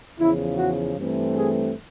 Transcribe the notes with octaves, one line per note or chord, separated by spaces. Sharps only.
E2 C#3 F3 E4
F#4
G2 E3 A3 C4
G#4